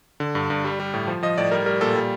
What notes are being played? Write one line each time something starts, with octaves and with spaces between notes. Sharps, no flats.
D3
G2
G2
G3
G3
A2
F3
F3 D#5
A2 D5
G3 A#4
G3 A#4
A#2 A4
G3